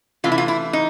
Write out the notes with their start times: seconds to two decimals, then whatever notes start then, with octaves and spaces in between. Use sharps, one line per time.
0.24 C3 E3 A3 F4
0.32 E4
0.38 F4
0.48 E4
0.73 D#4